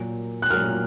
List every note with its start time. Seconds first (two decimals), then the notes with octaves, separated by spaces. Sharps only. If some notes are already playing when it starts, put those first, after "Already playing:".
Already playing: A#2 F#3 A#3
0.42 F#6
0.50 A#2 F#3 A#3 F6